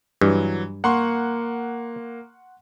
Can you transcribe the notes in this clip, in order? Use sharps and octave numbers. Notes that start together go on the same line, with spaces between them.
G2 E3 F#3
A#3 F#5 C6 C#6